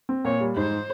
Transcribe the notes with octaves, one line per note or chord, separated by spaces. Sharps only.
C4
A#2 C#5
G3
G#2 C5